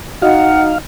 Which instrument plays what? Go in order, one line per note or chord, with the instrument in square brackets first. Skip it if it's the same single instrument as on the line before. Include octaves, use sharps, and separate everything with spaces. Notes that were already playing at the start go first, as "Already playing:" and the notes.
[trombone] D#4 [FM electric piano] F#4 D#5 [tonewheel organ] F5 [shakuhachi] F#5